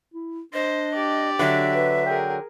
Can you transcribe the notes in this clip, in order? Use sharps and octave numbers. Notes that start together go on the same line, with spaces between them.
E4
D4 C5 D#5
G4 D5
D3 F#3 E5
B4
G#4 A#4 G5